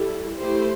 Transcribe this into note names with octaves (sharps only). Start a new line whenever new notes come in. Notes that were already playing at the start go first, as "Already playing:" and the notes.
Already playing: G3 E4 A4
A3 E4 G4 C5